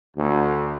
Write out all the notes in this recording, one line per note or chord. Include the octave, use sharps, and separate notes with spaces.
D2